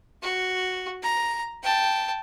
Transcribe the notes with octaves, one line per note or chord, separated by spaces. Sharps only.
F#4
A#5
G5 A5